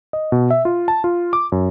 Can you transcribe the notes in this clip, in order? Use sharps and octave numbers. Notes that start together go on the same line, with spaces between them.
D#5
B2
E5
F4
A5
F4
D6
F#2